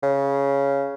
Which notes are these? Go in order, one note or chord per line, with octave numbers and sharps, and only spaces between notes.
C#3